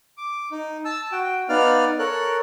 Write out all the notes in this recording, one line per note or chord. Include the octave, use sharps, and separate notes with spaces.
D6
D#4
A5 E6
F#4 G5
B3 D#4 D5 F5 F6
A4 A#4 C#5 F#6